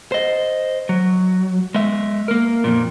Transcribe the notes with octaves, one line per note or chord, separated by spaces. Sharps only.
C5 D#5
F#3
G#3 E5
A#3 A#4
F2 A#2